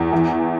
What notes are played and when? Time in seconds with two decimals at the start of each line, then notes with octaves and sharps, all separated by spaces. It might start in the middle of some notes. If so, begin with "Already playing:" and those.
Already playing: E2
0.12 E3